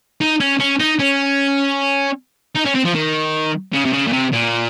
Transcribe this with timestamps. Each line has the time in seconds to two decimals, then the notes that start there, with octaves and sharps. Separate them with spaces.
0.21 D#4
0.40 C#4
0.60 C#4
0.80 D#4
0.99 C#4
2.56 D#4
2.66 C#4
2.75 C4
2.85 F3
2.95 D#3
3.73 C#3
3.85 C3
3.93 C#3
4.07 A#2
4.13 C3
4.33 A#2